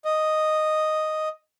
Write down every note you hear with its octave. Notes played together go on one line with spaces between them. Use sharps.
D#5